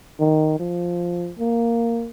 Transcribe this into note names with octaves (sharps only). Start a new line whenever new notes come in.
D#3
F3
A#3